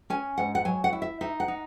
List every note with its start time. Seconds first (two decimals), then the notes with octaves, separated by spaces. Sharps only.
0.10 C#4 G#5
0.38 G#2 F#5
0.55 F#5
0.65 F#3 G#5
0.84 F#5
0.93 E4
1.02 E5
1.21 D#4 E5
1.40 F#5
1.48 D#4